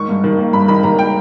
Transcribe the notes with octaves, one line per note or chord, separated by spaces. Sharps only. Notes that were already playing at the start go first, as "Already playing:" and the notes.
Already playing: G#2 D#3 C#6
G2
D#3
A#3
G2 B5
D#3 B5
D#3 A#5
G5